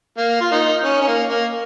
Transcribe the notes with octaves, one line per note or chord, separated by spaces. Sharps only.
A#3
F4
A#3 D#4
C#4
C#4
A#3
A#3